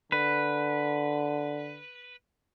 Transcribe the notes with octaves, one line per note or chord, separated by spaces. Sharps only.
D3 B4